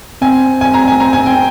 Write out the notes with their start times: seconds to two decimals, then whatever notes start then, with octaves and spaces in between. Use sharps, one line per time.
0.21 C4 G#5
0.61 G#5
0.74 A#5
0.88 G#5
1.00 C4 A#5
1.13 G#5
1.19 C4
1.26 G5